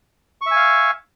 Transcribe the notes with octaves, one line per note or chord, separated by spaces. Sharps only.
E5 F5 G#5 C#6